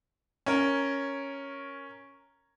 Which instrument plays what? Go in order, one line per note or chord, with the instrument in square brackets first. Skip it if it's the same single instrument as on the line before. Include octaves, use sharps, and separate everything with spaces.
[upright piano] C#4 A#4